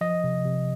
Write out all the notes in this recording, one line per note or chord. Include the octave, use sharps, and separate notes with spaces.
F3 D#5
C3
C3